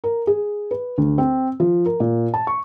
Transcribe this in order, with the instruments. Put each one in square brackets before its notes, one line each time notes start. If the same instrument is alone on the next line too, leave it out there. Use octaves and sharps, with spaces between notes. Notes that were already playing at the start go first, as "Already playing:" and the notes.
[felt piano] A#4
G#4
B4
D2
C4
F3
A#4
A#2
A5
C#6